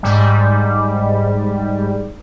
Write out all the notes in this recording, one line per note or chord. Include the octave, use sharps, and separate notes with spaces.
G#2 G3